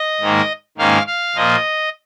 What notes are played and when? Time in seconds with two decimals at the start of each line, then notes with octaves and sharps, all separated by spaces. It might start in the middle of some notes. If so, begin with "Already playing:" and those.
Already playing: D#5
0.21 G#2 D#3 A#3
0.78 G#2 D#3 A#3 C#4 F5
1.07 F5
1.35 A#2 F3 A#3 D#5